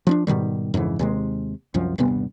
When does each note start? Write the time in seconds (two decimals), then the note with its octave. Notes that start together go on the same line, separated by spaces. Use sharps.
0.07 F3 C#4 D4
0.27 G#2 B2 D#3 G3
0.74 F2 G#2 C#3 E3
0.99 D#2 C3 G#3
1.74 C2 F#2 F3
1.98 D#1 G2 C3 B3